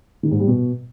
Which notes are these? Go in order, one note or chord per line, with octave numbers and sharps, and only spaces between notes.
D#3
G#2
G3
B2